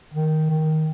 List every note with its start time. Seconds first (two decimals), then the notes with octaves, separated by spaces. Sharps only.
0.14 D#3
0.50 D#3